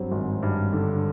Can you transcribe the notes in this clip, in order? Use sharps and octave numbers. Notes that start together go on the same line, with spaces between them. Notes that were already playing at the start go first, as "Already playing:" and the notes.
Already playing: G2 F#3 C4 C5
G#1
G2
D3